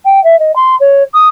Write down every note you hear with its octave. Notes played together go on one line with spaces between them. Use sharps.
G5
E5
D#5
C6
C#5
D#6